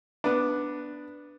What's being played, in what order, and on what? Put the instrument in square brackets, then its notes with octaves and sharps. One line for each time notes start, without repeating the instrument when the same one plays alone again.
[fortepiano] B3 D4